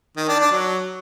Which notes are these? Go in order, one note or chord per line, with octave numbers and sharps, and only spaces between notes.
D#3
D4
D4
F#3